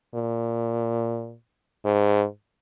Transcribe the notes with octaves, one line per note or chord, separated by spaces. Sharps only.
A#2
G#2